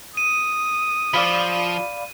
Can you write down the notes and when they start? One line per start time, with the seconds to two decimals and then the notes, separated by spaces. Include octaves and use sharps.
0.17 D#6 D#7
1.14 F3 D5 F5 B5